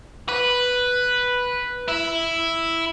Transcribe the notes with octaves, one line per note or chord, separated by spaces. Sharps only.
B4
E4